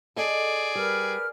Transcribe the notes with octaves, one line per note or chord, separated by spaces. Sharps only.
G#4 A4 D5 D#5
G3 A#4 B4 F6